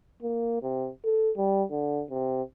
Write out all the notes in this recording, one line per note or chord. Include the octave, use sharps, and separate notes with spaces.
A#3
C3
A4
G3
D3
C3